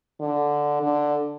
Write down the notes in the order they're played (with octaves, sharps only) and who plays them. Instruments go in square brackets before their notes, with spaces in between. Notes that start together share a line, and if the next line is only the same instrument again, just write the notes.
[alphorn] D3
D3